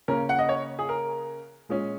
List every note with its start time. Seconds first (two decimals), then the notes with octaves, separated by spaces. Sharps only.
0.08 C#3 A#3 C#4 A#4
0.29 F#5
0.39 D#5
0.49 C#5
0.79 G#4
0.89 A#4
1.69 A#2 G#3 C#4